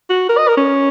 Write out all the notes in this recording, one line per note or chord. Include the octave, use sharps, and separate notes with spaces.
F#4
A#4
D#5
A#4
C#4